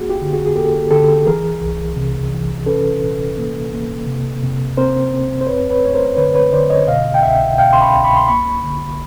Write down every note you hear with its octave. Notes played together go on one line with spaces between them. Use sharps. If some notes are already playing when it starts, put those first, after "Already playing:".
Already playing: A#3 F#4 G#4
F4 G4
D3
F#4 G#4
G#4
A#3 G4 A4
D3 G4 A4
E3 G#4 A#4
C2
C3
E3
C#4 A4 B4
A#2
A#3
A#3
C3
C3
C4 A#4 C5
C4
C5
F#2 B4 C#5
B4 C#5
A3 C#5
A#4 C5
D3 B4 C#5
B4 C#5
D3 C5 D5
C#5 D#5
B2 D#5 F5
G5
C2 E5 F#5
B2 F5 G5
C6
B5 C#6
C2
B5 C#6
C6
A#3 B5 C#6
D3